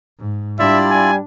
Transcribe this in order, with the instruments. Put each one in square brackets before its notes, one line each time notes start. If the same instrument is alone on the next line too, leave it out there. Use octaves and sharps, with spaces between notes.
[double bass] G#2
[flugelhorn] G3 [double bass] D4 [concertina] E4 F4 D5 [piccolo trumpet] E5
[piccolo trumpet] G#5